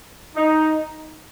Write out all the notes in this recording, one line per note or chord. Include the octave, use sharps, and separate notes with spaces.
D#4